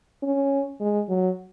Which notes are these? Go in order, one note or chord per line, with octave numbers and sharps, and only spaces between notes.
C#4
G#3
F#3